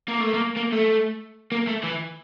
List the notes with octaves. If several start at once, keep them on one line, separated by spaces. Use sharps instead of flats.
A#3
A3
A#3
A#3
A3
A#3
A3
E3